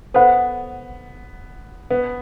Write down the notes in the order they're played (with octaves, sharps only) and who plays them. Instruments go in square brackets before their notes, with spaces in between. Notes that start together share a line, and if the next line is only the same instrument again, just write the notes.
[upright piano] B3 [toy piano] A4 C5 F#5 B5
[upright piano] B3